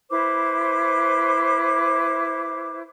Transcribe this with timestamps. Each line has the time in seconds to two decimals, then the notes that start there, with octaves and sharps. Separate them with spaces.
0.09 E4 B4 C5 D6